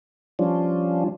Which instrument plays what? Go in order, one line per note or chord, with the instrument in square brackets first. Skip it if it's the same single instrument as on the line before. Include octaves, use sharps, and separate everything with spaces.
[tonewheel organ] F3 G3 C#4 D4 F4